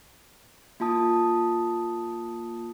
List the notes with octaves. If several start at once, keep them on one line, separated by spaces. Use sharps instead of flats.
A#3 F4 A5 D#6